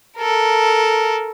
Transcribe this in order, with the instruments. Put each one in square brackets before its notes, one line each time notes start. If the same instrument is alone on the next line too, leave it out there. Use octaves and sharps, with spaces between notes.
[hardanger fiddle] A4 A#4